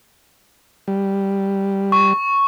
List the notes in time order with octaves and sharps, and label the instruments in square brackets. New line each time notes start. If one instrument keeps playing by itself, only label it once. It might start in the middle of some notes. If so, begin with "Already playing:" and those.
[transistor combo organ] G3
[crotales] C#6